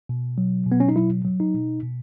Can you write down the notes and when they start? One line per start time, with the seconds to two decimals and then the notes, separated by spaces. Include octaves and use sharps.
0.09 B2
0.38 F#3
0.66 B2
0.72 B3
0.80 C#4
0.89 D#4
0.96 F#3 E4
1.25 F#3
1.40 D#4
1.54 B2
1.83 B2